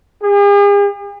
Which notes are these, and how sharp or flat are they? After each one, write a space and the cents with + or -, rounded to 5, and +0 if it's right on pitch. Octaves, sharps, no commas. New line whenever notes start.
G#4 -45